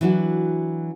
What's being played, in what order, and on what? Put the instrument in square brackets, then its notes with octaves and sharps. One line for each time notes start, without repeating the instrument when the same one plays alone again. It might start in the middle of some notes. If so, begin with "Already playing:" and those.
[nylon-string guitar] E3 F#3 D4 F#4